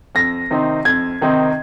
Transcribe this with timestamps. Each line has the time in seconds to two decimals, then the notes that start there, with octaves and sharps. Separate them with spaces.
0.15 F2 A#6
0.51 C3 D#3 C4 D#4
0.85 F2 G#6
1.21 C3 D#3 C4 D#4